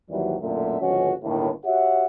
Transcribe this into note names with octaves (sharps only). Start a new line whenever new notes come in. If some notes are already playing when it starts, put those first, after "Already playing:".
G#1 D#2 E3 F#3 G3
B1 F#2 A#2 D3 A3 E5
G1 C#2 F3 G#3 C#4 F#4
G1 D#2 A2
F#4 G4 C#5 E5 F#5